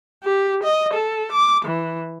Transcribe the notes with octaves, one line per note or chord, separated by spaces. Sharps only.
G4
D#5
A4
D6
E3